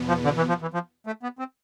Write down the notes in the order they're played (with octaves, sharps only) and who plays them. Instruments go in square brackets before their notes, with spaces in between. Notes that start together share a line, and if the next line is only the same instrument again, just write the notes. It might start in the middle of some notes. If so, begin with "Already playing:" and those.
Already playing: [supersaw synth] E2 B2 B3
[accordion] F3
D3
E3
F3
E3
F3
A3
B3
C4